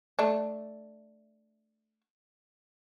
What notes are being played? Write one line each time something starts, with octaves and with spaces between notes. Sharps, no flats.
A3 D4